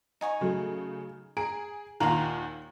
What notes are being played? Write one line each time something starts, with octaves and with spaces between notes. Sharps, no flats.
D#4 G#5 C#6
C#3 F#3 A3
G#4 A#5 D7
D#2 A#2 D#3 F4 F#5 A#5